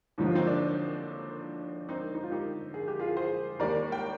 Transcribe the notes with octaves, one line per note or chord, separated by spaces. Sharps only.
D#2 D3 F3 D#4
F4
C4 D#4
D4
C4 D#4
D#4
F4
D#4 G4
G#4
G4
F4 G#4
G#4 C5
D#2 D#3 G3 A#4 D5
G5